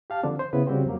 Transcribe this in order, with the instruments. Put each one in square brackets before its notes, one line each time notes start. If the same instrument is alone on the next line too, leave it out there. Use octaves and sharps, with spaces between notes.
[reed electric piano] G4 F5 A5
D3 F3 C4 D4
C5
C#3 B3 E4 B4
C#3 G3 C4 F#4 G4 C5
F2 F#3 A#3